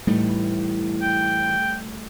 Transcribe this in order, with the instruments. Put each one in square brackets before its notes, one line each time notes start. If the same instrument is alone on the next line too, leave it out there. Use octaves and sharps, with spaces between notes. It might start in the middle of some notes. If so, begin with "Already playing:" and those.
[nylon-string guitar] A2 E3 D#4 [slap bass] G3 A3
[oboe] G5